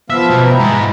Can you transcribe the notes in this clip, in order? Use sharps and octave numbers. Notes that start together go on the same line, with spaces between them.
F3 B3 E5 F5
B2
E4 G5 A#5
G#2 G#3